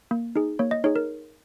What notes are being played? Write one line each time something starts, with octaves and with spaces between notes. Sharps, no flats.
A#3
D#4 G#4
A#3 C#5
D#5
D#4 G#4 C#5
A#4